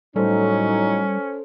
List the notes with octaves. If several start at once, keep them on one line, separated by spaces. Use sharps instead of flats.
A2 F#3 G3 C#4 D#4 A4 C5